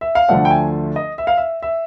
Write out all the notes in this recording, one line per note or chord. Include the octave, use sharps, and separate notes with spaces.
E5
F5
D2 D3 F3 A3 D4 F#5
G5
G#5
D#5
E5
F5
E5
E5